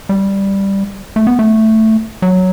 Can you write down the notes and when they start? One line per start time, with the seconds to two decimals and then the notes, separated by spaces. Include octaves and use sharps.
0.09 G3
1.16 A3
1.27 B3
1.39 A3
2.22 F#3